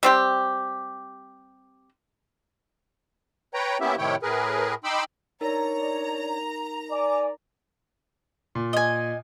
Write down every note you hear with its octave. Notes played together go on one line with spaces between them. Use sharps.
G3 C4 G4
B4 C#5 G5 A#5
A#3 B3 C#4 E4 G4 E5
A2 C3 D#3 E4 C#5 G5
A2 G#4 A#4 B4
D#4 G5 B5 C6 D6 E6
D4 D#4 A#4 C#5 D5 A#5
D5 G#5 D6
A#2
D#5 G#5